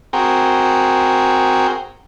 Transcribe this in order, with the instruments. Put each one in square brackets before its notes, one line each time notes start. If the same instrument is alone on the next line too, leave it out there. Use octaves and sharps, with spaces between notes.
[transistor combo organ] C4 F#4 G#4 A#4 G5